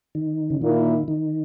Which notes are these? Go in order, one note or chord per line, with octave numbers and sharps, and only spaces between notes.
D#3
C#3
A#2 D#3 A#3 E4
D#3